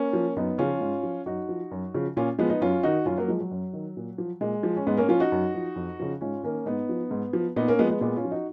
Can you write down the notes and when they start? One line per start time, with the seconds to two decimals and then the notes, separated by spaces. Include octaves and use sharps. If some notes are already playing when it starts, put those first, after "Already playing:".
Already playing: A#3 C#4
0.13 F3
0.37 F#2 B3 D#4
0.58 C#3 F3 C#4 F4
0.81 G#2
1.03 F3
1.26 F#2 D#4 F#4
1.49 F3
1.71 F#2
1.94 C#3 F3
2.17 A#2 C#4 F4
2.38 F3 G#3 B3
2.50 B3 D#4
2.61 F#2 C#4 F4
2.83 D#3 D#4 F#4
3.06 F#2 C#4 F4
3.18 F#3 A#3
3.28 F3 G#3
3.41 F#3
3.51 F#2
3.73 D#3
3.97 A#2
4.18 F3
4.41 A#2 G#3
4.63 F3
4.77 C#4
4.87 G#2 G#3 B3
4.97 A#3 C#4
5.09 F3 C#4 F4
5.20 D#4 F#4
5.32 F#2
5.55 F3
5.76 F2
6.00 C#3 F3
6.21 G#2 C#4 F4
6.43 D#3 A#3 C#4
6.66 G#2 B3 D#4
6.89 F3
7.11 G#2
7.33 F3
7.56 A#2 B3 D#4
7.68 A#3 C#4
7.79 F3 G#3 B3
7.90 G#3 B3
8.01 A#2 G#3 B3
8.16 C#4 F4
8.25 F3
8.31 D#4 F#4